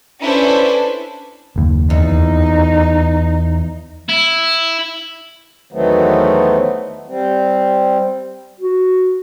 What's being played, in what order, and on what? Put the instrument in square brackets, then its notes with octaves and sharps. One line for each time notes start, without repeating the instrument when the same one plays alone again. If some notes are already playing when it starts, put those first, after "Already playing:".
[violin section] C#4 D4 E4 A4 B4 C5
[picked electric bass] F#1 D#2
[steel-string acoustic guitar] E2 [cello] D#4
[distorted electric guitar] E4
[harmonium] E2 D#3 F#3 A3 B3 C4
G3 C4
[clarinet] F#4